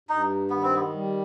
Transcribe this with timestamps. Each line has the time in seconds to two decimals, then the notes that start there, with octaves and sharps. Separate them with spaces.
0.09 G2 D#4
0.50 D#3 B3
0.63 C4
0.76 B3
0.92 G3